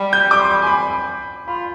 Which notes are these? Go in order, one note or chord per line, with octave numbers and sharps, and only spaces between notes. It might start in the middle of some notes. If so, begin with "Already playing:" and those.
Already playing: G3
G6
D6
C6
G#5
B5
F4 B5